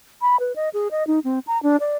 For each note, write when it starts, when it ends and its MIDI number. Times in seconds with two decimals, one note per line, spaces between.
0.22 0.37 83
0.40 0.55 71
0.56 0.69 75
0.74 0.88 68
0.91 1.06 75
1.07 1.20 63
1.24 1.39 60
1.47 1.61 82
1.63 1.77 62
1.80 1.97 74